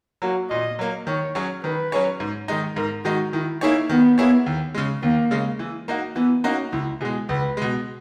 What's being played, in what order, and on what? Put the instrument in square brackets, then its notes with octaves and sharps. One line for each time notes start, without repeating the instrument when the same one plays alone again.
[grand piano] F#3 A#3 [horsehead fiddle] F#4
[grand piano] A#2 [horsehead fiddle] D#5
[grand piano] F#3 A#3
[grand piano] D#3 [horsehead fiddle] C#5
[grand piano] F#3 C#4 G#4 C#5
[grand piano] D#3 [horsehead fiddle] B4
[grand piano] F#3 C#4 G#4 C#5
G#2
D#3 G#3 D#4
[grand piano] G#2 [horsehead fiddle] A#4
[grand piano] D#3 G#3 D#4 [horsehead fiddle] F#4
[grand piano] D#3 [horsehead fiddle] E4
[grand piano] A#3 E4 G#4 C#5 [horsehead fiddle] D#4
[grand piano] D#3 [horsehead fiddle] B3
[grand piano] A#3 E4 G#4 C#5
D#2
C#3 G#3
[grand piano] D#2 [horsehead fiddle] A#3
[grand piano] C#3 G#3
E3
A#3 D#4 F#4
[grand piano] E3 [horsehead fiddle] B3
[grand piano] A#3 D#4 F#4 [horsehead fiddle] C#4
[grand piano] C#2 [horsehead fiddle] E4
[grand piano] B2 [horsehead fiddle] G#4
[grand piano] G#3
[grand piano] C#2 [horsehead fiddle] B4
[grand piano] B2 G#3